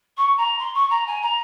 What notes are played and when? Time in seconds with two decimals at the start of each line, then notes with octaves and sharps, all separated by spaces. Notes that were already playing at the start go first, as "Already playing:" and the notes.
0.17 C#6
0.37 A#5
0.59 C6
0.74 C#6
0.90 A#5
1.07 G#5
1.22 A#5